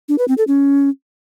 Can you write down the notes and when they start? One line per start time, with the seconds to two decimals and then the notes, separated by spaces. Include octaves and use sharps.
0.09 D4
0.18 B4
0.28 C4
0.38 A4
0.47 C#4